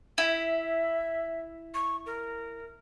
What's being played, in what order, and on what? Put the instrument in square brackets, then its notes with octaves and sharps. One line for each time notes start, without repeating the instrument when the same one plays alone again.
[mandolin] E4 [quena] E5
[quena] C#6
A#4